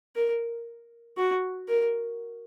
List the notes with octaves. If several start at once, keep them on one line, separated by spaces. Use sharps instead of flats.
A#4
F#4
A#4